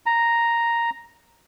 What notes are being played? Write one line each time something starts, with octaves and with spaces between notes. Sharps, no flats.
A#5